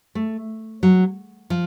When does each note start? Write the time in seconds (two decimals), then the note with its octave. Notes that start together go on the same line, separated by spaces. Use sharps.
0.15 A3
0.83 F#3
1.50 F3